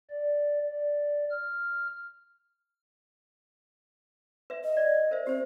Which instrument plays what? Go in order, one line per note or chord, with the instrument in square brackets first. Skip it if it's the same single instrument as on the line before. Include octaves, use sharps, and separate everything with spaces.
[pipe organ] D5
D5
F6
[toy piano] B4 E5
[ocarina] D#5
[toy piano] D5
A#4 C5 E5
[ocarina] C4 [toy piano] G4 C5